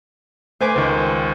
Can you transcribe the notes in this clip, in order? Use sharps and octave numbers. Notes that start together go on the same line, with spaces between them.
A3 B4 C5 G#5 D6
C#2 D#3